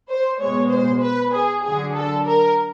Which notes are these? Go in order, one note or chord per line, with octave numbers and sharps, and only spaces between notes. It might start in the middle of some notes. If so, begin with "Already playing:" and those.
C5
B2 G#3 C#5
C5
B4
G#4
D3 F#3 G#4
A4
A#4